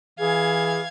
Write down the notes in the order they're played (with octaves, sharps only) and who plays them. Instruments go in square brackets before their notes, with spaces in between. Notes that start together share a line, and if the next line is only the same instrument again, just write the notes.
[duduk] E3 [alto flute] G#4 [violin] F5 G#6